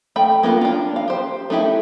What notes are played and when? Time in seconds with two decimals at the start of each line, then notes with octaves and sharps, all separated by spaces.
0.16 A3 G5 B5
0.43 A#3 B3 F4
0.61 D4 F4
0.96 F5
1.08 G4 C5
1.50 A3 D#4 E4 G4